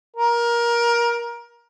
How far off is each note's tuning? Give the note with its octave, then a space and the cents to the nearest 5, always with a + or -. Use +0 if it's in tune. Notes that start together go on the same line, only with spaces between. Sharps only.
A#4 +20